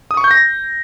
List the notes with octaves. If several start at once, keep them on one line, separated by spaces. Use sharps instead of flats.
D#6
C#6
G6
A#6